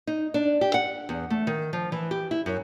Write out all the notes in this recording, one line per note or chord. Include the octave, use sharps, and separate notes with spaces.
D#4
D4
G4
F#5
E2
A3
D#3
F3
E3
G4
E4
F#2